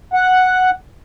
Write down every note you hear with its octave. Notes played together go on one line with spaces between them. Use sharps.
F#5